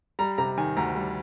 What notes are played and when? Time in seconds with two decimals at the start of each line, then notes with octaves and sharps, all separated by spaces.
0.19 G3 A#5
0.38 C3 A#5
0.57 D#3 G#5
0.77 D2 A#5
0.95 G3